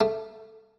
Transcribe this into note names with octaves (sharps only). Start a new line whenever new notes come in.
A3